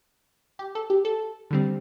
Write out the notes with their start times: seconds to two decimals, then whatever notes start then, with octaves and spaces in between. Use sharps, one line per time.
0.59 G4
0.75 A4
0.90 G4
1.05 A4
1.51 D3 G3 C4